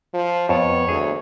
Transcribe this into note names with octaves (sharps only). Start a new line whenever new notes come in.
F3
F2 B3 C#5 A5
D2 G#4